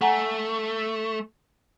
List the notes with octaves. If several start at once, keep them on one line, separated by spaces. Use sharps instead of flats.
A3 F#5 G#5 A#5